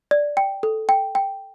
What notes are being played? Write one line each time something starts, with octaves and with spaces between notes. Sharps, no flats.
D5
G5
A4
G5
G5